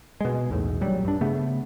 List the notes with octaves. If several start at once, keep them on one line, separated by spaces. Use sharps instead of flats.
B2 G#3
B1 E2 A2
A#1 F#3 G3
G2 D4
C#3 A3 B3